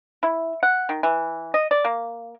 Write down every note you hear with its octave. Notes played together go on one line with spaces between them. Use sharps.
E4
F#5
D#3
E3
D#5
D5
A#3